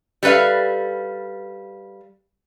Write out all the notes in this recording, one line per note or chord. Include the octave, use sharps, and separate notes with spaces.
G3 A4 B4 E5 F5